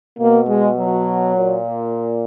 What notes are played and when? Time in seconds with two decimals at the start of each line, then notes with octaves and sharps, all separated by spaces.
0.19 B2 A#3
0.47 G#3
0.77 F#3
1.34 A#2